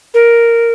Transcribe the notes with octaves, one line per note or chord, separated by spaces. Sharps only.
A#4